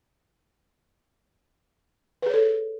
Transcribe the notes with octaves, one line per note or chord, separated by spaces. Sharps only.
G#4 A4 B4 C#5